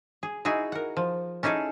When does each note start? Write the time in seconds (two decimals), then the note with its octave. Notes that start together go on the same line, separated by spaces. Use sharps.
0.23 G#4
0.45 D#4 E4 F#4 G#4
0.72 A#4 F#5
0.97 F3
1.43 C#4 D#4 E4 G#4 A4